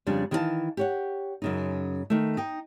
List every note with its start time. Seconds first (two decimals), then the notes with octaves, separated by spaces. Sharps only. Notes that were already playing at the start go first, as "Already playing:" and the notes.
0.07 F2 C#3 G3 D4
0.31 D#3 E3 A#4 B4 F5 A5
0.77 G4 C#5 F#5
1.42 F#2 C#3 D#4
2.10 D#3 A3
2.37 D#4 G5